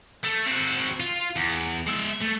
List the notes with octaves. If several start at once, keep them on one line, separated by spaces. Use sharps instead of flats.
A3
C4 F#4
F4
E2
G#3 E5
A3